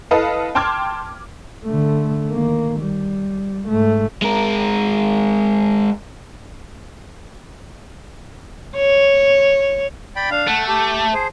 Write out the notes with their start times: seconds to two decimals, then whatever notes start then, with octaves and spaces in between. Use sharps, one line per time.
0.11 E4 A4 B4 D#5 F5 A5
0.55 G5 A5 C6 D6 F6 G#6
1.64 D3 A3
2.29 D#3 A#3
2.80 G3
3.67 G#2 A3
4.22 G#3 A#4
8.77 C#5
10.16 D5 G5 B5
10.31 D4 F5
10.48 A3 F#5 A5
10.68 G4 A5
11.13 G#4 C5